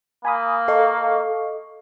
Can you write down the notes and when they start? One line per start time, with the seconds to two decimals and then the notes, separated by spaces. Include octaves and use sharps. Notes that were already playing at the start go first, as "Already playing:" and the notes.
0.25 A#3 G#5 B5 D#6
0.68 A4 D#5 F5 C#6